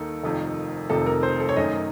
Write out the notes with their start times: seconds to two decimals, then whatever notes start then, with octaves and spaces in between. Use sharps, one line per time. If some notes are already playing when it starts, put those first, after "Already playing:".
Already playing: D#2 D#3 D#4 A4
0.23 F1 F2 C3 D#3
0.90 F1 F2 C3 D#3 A4
1.06 A#4
1.23 C5
1.40 A4
1.49 C#5
1.56 F#2 D#3 A3 C#4 D#5